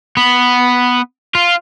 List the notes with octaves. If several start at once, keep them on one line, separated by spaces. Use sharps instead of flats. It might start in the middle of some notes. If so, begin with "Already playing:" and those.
B3
F4